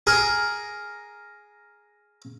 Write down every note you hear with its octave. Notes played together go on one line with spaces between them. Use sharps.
G#4 A#4